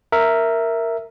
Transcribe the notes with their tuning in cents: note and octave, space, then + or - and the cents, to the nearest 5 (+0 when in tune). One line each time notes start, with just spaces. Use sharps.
A#4 -5 E5 +0